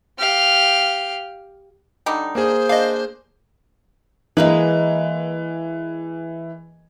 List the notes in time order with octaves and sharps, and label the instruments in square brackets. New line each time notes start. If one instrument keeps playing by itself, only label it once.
[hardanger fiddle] G4 F5
[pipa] D3 G3 D#4
[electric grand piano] A#3 G#4 [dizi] C5
[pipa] D4 [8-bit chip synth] D#5 F5
[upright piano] E3 [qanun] G#3 A#3 B4